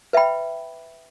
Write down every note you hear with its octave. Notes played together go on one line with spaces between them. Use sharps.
B4 E5 G5 B5